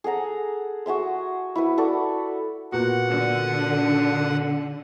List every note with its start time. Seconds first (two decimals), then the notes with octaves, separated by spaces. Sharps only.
0.04 G#4 A4 F#5 A#5
0.86 F#4 G#4 E5 C6
1.55 E4 F#4 B4
1.78 F#4 A4 D5
2.72 A#2 B3 F#4 F#5
3.09 D3